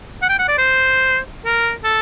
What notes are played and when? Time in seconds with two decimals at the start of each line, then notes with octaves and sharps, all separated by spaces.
0.22 F#5
0.29 G5
0.39 F#5
0.48 D5
0.58 C5
1.45 A#4
1.84 A4